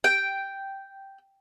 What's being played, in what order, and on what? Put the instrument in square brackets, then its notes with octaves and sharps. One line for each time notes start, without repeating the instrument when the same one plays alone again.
[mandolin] G5